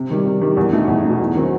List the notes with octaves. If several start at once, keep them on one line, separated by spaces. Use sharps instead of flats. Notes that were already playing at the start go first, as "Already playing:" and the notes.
Already playing: C3
D#3 G3
C3
D#3 G3
E2
B2 A3 D#4
E2
B2 A3 D#4
E2
D#3 F#3 C4 D#4